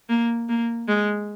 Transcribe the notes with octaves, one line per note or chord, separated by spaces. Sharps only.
A#3
A#3
G#3